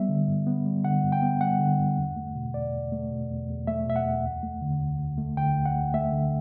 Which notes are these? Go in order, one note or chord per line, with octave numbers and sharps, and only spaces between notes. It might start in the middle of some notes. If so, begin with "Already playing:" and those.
Already playing: G3 B3 E5
D3
G2
B3
G3
D3 F#5
G2
G5
B3
G3 F#5
D3
G2
E2
A3
B2
E2 D5
E2
A3
B2
E2
E2
A3 E5
B2 E5
F#5
E2
D2
A3
D3
D2
D2
A3
D3 G5
D2
F#5
D2
A3 E5
D3